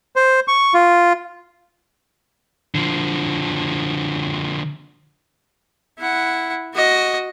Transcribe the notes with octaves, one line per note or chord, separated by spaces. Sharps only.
C5
C#6
F4
D3 F3
E4 F#5
F#4 D#5